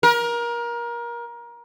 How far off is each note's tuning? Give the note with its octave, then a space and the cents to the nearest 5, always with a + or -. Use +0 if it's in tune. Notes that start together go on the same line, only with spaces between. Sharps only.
A#4 +25